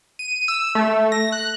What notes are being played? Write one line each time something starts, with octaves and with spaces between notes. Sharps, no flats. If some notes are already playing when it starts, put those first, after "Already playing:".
D#7
E6
A3
A#6
F#6